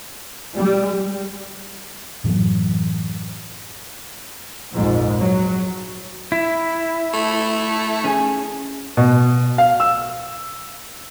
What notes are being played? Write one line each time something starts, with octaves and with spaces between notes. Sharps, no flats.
G3
F#2 A2 E3 F#3
A#1 F2 G#2
F#3
E4
A3
C#4 G#4 G#5
B2
F5
E6